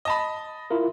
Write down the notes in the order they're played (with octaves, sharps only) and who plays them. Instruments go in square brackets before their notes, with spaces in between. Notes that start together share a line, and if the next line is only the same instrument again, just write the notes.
[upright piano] D#5 A5 B5
[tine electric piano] E4 F4 A#4